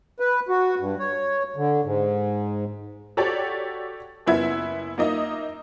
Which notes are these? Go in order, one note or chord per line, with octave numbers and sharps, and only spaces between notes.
B4
F#4
G2
C#5
D3
G#2
F#4 G4 A4 C#5 D5
F#1 B3 E4 E5 G#6
A#3 D#4 D#5 E5